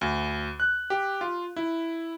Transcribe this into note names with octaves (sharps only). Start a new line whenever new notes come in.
D2
F#6
G4
F4
E4